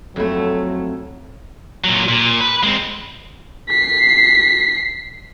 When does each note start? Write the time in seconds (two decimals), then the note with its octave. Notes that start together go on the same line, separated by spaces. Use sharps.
0.16 F2 F#3 A3 E4
1.84 A#2 F#3
2.09 A#2
2.41 B4
2.63 G#3 C4
3.69 B6 C7